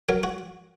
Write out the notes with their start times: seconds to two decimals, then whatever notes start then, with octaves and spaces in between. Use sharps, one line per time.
0.09 F#3 A#4
0.23 F#4